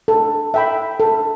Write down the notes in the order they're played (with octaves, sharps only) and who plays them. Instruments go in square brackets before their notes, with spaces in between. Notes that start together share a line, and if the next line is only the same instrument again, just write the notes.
[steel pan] A4
E5 G5 B5
A4